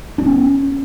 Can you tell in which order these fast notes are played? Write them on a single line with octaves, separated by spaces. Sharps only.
D4 C#4 B3